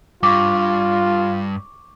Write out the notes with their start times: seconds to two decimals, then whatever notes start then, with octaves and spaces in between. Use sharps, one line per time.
0.23 G2 F4 C#6 D6